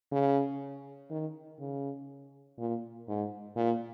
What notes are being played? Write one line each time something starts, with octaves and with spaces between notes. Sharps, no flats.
C#3
D#3
C#3
A#2
G#2
A#2